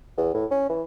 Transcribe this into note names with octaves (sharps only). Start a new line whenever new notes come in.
E2
A2
C#4
E3